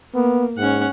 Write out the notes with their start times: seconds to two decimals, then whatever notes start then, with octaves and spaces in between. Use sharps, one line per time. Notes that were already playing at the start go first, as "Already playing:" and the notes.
0.14 A#3 B3
0.58 G#2 C#4 F#5